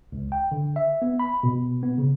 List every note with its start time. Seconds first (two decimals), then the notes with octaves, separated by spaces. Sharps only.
0.12 C#2
0.32 G5
0.52 D3
0.76 E5
1.02 B3
1.20 B5
1.43 B2
1.83 B3
1.98 C#3